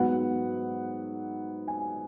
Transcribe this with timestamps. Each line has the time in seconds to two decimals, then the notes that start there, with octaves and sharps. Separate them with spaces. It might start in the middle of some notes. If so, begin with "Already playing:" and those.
Already playing: G#2 F#3 B3 F#5
1.68 G#5